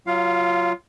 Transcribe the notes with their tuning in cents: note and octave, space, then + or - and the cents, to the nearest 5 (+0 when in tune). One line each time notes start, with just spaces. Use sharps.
F#3 +0 F4 -15 F5 +10